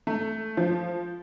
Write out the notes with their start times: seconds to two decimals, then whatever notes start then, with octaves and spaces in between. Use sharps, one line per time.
0.07 A3
0.57 F3